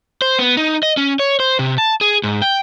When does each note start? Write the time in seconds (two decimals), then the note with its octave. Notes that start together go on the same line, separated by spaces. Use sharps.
0.22 C5
0.39 B3
0.57 D#4
0.83 D#5
0.97 C#4
1.19 C#5
1.40 C5
1.59 C3
1.78 A5
2.01 G#4
2.24 G#2
2.42 G5